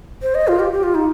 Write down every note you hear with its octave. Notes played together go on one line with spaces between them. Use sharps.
C5
D#5
F4
G4
G4
F4
D#4